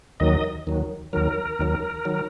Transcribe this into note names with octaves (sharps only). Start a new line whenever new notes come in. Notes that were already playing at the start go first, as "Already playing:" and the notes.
D#2 D#3 F#3 D#5
D#2 D#3 F#3
D#2 D#3 F#3 A#4
D#2 D#3 F#3
D#3 F#3